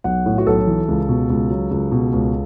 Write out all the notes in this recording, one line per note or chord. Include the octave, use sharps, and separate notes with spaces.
B1 F#5
A2
F#4
B1 A4
E3
C#2
B2
C#2
F#3
C#2
B2
C#2